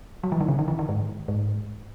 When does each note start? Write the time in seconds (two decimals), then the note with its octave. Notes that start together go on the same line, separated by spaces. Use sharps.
0.23 F#3
0.32 E3
0.41 D#3
0.48 C#3
0.59 D#3
0.68 E3
0.79 D#3
0.89 G#2
1.28 G#2